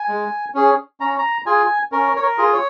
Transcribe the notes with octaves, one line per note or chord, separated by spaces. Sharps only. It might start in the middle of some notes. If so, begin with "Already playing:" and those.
Already playing: G#5
G#3
C#4 G#4
C#4 A#5
A#5
F4 G#4 G#5
C#4 A#4
C#5
A#4
F4 G#4
C#5